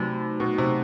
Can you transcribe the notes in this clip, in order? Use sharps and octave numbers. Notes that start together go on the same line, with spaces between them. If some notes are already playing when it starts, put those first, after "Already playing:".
Already playing: C3 F#3 A3 D#4 F#4
B2
C3